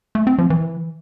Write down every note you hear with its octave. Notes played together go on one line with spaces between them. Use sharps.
A3
C4
F3
E3